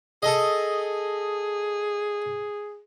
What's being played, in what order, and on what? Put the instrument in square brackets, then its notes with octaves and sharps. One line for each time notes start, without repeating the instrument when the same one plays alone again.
[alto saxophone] G#4 [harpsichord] A4 D#5